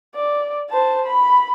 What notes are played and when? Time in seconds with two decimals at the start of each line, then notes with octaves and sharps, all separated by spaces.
0.15 D5
0.70 C5 A5
1.06 B5